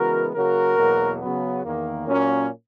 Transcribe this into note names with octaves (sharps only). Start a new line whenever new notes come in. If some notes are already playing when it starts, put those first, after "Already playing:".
Already playing: C#3 E3 G#3 B3 F#4 A#4
C#3 F#3 A#3 F#4 A#4
E2 B2 F#3 A#3
C#3 F#3 B3
E2 D#3 A#3
A#2 F#3 A#3 C#4